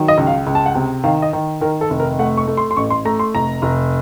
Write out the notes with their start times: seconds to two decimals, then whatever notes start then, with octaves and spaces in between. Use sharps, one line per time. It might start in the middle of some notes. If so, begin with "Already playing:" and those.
Already playing: D#3 F#3
0.08 D#5
0.18 C#2
0.27 F5
0.47 C#2
0.55 A5
0.66 F#5
0.75 C3
1.04 D#3 F5
1.22 D#5
1.33 D#3
1.61 D#3 A#4
1.81 A4
1.90 F1
2.00 A#4
2.19 A3 F#5
2.37 C#6
2.47 A3
2.57 C6
2.71 C6
2.77 A1 C#6
2.90 C6
3.05 A3 A#5
3.19 C6
3.34 F1 A#5
3.62 F1